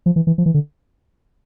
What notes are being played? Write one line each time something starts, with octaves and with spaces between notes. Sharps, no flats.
F3
E3
E3
F3
E3
D3